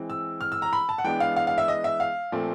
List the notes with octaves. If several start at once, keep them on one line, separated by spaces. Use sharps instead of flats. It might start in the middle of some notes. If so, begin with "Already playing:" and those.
Already playing: E3 G#3 C4
E6
F6
E6
A#5
B5
A5
F#5
E3 G#3 B3 D4 G5
F5
F5
F5
E5
D#5
E5
F5
A#2 F3 A3 C4